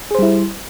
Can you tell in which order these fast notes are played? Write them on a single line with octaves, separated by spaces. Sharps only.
G#4 C5 G3 E4